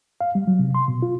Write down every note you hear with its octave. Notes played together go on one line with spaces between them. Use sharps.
F5
G3
F#3
C3
C6
B2
F4